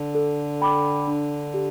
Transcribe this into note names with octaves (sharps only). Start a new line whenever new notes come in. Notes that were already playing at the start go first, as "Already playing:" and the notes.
Already playing: D3
A4
G5 B5 D6
D4
G4